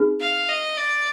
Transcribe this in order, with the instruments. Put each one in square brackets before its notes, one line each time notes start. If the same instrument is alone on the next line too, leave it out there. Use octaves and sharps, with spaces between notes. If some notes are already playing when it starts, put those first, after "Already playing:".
Already playing: [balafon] C4 D#4 G#4
[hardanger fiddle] F5
D#5
D5